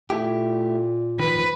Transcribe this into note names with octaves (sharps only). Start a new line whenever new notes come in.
A#2 A3 E4 G4
D#3 F3 B4